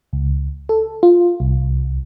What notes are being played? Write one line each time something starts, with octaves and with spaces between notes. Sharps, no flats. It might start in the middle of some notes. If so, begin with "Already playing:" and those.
C#2
A4
F4
C2